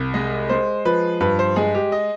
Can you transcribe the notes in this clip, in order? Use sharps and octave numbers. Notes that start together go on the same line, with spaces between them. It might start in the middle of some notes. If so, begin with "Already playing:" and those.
Already playing: C2
G#3 D#5
G#3 C5
F3 B4
G2 B4
C5
G#3 G#4
G4
D#5